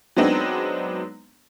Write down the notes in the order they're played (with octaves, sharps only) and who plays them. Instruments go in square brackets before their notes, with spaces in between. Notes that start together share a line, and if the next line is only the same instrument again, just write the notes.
[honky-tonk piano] F#3 G#3 B3 C4 D4 D#4